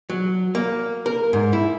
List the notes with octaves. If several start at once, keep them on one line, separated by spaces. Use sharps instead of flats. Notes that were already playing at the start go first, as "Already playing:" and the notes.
F#3
A#3
A#4
G#2
E4